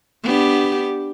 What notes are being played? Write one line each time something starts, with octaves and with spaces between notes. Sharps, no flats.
B3 D4 G4